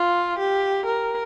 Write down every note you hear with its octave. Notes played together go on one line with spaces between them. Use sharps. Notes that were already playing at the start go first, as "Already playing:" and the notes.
Already playing: F4
G4
A#4